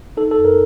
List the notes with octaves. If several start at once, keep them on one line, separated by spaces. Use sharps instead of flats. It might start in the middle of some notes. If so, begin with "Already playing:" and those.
D#4 A4
A4
F#2
A#4